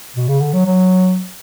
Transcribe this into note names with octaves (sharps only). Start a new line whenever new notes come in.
B2
C#3
D3
F#3
F#3